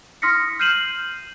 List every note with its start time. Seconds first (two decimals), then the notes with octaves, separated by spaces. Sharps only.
0.22 C6 D#6 F6 A#6 B6 C#7
0.59 F6 G6 C7 D#7 E7 F#7